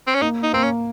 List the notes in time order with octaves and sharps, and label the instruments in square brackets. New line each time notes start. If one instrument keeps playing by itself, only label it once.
[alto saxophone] C4
C#4
[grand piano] A#3 [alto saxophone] D#4
[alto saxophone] D#4
[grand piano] A#3 [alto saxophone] C4
[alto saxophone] C#4